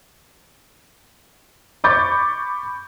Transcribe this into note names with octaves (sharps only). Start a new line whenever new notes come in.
B5 C#6 D6 G6 A6